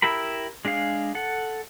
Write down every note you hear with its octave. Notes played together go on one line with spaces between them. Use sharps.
E4 G4 A#4 B5
G#3 D4 G#4 F5
A4 F#5